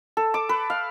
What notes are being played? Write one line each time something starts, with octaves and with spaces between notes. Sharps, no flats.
A4
D6
B4
F5